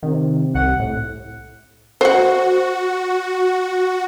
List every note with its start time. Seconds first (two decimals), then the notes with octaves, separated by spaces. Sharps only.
0.03 C3 D#3
0.55 C2 F#5
0.79 A2
2.01 F#4 C5 F#5